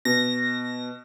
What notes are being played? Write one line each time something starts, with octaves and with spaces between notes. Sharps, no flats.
B2 A#6